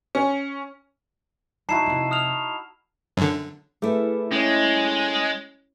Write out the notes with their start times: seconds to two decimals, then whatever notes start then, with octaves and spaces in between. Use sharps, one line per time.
0.15 C#4
1.69 A#1 D#4 E4 F#4 A5 C7 E7
1.86 F2 C3
2.11 D#6 F6 F7
3.17 F#2 D3
3.82 A3 E4 G#4 B4
4.32 G#3 C#4 C#5